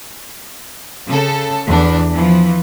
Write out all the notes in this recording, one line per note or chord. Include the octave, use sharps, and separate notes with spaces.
C#3 A4
E2 D4
E3 F3